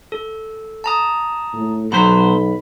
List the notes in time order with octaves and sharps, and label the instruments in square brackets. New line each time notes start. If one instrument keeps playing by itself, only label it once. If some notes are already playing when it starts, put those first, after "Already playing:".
[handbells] A4
A5 A#5 D#6
[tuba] A2
[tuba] B1 [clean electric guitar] B2 F#3 C5 [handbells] B5 B6